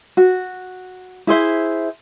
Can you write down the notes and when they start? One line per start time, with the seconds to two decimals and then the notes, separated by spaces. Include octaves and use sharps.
0.17 F#4
1.27 E4 G#4 C5 E5